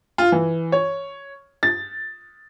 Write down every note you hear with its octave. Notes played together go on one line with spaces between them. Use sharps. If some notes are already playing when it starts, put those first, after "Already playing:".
F4
E3
C#5
A6